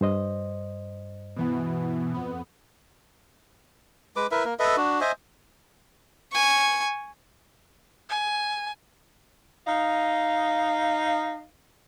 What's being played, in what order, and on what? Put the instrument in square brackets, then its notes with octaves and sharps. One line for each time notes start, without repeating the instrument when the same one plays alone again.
[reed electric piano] G2 C5 D#5
[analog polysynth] B2 E3 B3
F2 B3
[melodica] G#3 B4 D6
E4 A#4 B4 E5
A#3 A#4
A4 B4 D#5 E5
D4 F#4
C5 D#5 E5 G#5
[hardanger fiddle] G#5 C#6
[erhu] G#5
[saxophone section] D#4 D#5 F5